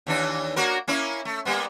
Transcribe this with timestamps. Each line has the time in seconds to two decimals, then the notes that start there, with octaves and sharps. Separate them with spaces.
0.07 D#2 E3 D4
0.56 A#3 F#4 A#4
0.88 A#3 C#4 E4
1.25 A3
1.45 G3 A#3 B3